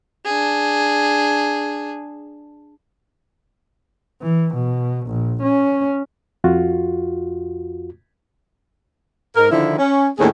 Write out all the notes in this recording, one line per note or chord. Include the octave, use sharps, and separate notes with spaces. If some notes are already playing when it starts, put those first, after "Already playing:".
D4 G#4
E3
B2
A#1
C#4
F2 F4 F#4
G#2 A#4
D3 D#3 F3 E4
C#4
D#2 A2 B3 C#4 D4 G#4